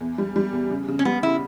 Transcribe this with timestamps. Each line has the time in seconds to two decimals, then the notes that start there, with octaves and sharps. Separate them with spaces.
0.01 E2
0.18 G3
0.36 G3
0.53 E2
0.70 C#3
0.88 C#3
0.99 C#4
1.05 G3 B3
1.23 C#3 E4